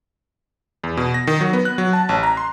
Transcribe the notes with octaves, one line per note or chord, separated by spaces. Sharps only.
E2
B2
A#6
D#3
F#3
B3
F#6
F#3
A5
A1
A#5
C6